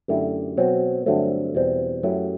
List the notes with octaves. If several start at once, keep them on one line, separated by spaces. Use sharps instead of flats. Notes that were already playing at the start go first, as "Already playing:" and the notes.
F#2 D3 A3 E4 G4
B2 F#3 C4 F#4
G2 D3 F#3 A3 C4
E2 B2 G3 C4
F#2 F#3 A3 E4 G4